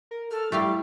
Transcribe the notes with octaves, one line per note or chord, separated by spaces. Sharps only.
A#4
A4 F6
G3 A3 E4 G4 F5